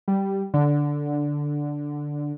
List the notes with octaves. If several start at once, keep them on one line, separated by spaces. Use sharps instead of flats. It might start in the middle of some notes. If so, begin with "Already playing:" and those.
G3
D3